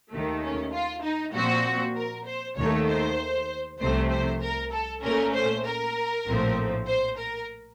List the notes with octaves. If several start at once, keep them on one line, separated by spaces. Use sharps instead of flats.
D#2 D#3 A3
C#4
F4
D#4
A#2 F3 C4 F#4
A#4
C5
D#2 D#3 A3 C#5
C5
C2 C3 F3 A3 C5
C5
A#4
A4
A#2 A3 C#4 A#4
C5
A#4
A#1 A2 F3 A3 C4
C5
A#4